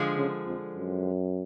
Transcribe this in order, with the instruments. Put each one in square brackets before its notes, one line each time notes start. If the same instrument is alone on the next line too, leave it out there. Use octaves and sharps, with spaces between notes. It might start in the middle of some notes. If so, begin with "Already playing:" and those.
Already playing: [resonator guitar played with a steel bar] D3 F3 G#3
[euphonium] C#3
F2
F#2